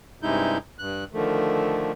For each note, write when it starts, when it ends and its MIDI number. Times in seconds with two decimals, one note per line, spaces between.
0.23 0.58 43
0.23 0.58 48
0.23 0.58 56
0.23 0.58 63
0.23 0.58 64
0.23 0.58 91
0.79 1.04 43
0.79 1.04 90
1.13 1.92 50
1.13 1.92 51
1.13 1.92 53
1.13 1.92 57